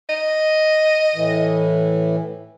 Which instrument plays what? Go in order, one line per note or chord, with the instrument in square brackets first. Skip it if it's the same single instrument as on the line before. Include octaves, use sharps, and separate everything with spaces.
[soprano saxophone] D#5
[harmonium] A2 E3